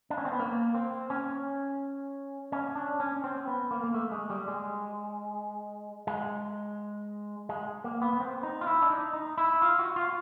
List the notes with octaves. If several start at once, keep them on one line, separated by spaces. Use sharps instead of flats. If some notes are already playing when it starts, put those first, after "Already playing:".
D4
C#4
C4
B3
A#3
C4
C#4
C#4
D4
C#4
C4
B3
A#3
A#3
A3
G#3
G3
G#3
G#3
G#3
A#3
B3
B3
C4
D#4
F4
E4
D4
D#4
D#4
E4
F4
F#4
F4